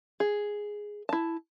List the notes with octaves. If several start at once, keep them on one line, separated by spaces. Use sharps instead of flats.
G#4
E4 A5